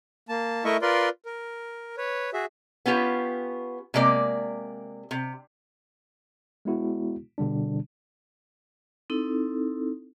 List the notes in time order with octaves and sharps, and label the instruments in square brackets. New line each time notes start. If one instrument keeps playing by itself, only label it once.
[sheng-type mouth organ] A#3 A5
A3 E4 A#4 D#5 E5 C#6
F4 A#4 B4 D5 C6
A#4
B4 C#5
F#4 G#4 E5
[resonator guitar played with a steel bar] B3 C#4 F4 G4
C3 G#3 A#3 D5
C3
[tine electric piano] G#3 B3 E4 F#4
B2 D3 G3 D4
[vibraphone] C4 D#4 E4 A4